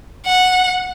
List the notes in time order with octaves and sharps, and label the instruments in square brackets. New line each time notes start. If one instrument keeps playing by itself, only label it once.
[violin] F#5